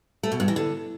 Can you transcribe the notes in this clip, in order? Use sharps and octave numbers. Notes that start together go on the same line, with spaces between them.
A3
B2
G2
E3
D3